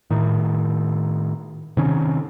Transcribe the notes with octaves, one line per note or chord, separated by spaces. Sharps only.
A2 D#3
C3 D#3 C#4